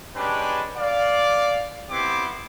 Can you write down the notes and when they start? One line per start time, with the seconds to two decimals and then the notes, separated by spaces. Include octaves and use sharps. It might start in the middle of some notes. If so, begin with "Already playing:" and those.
0.15 G#3 C#4 D4 G4 B4
0.77 D5 F5
1.90 B3 C4 E4 G4 C6 D6